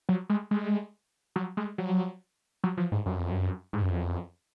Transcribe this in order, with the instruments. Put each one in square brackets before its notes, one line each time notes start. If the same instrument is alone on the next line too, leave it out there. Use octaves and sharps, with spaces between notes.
[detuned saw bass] F#3
G#3
G#3
F#3
G#3
F#3
F#3
F3
G#2
F#2
F2
F#2
G#2
F#2
F2